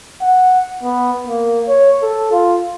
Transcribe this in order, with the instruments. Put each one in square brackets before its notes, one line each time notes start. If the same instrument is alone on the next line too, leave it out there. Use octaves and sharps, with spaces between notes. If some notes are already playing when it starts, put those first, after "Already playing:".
[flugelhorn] F#5
B3
A#3
C#5
A4
F4